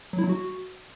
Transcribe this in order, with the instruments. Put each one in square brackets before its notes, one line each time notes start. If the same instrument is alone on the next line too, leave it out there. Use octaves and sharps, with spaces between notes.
[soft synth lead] F#3
E4
F#3
F#4